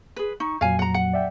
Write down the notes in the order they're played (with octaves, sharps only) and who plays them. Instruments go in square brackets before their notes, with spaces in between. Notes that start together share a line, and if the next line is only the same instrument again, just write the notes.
[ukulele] G#4 B4
[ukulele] D#4 [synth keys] C#6
[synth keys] F2 A#2 F#3 [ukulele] F5 G#5
[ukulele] F#5 A#5
F#5
[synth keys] D5 E5 G5